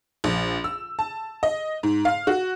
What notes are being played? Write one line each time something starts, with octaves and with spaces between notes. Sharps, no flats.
A#1
E6
A5
D#5
G#2
F5
F#4